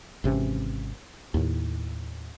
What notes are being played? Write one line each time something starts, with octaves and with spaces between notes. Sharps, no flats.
G#1 C3 E3 C#4
D#2 A2